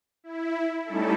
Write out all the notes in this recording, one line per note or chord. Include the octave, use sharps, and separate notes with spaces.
E4
G3 A3 C#4 D#4 E4 A4